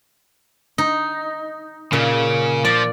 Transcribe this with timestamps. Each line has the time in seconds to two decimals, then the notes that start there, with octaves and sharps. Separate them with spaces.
0.78 D#4
1.93 A#2 C#3
2.65 F3 D5